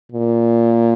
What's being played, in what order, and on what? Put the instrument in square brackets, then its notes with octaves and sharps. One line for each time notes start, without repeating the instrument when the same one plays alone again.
[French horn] A#2